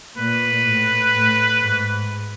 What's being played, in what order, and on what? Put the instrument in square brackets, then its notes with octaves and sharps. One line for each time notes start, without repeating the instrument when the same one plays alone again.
[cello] A#2 [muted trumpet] B4
[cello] A2
A2
G#2